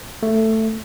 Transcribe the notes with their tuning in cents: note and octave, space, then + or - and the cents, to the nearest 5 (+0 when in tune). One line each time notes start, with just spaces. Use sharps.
A3 +10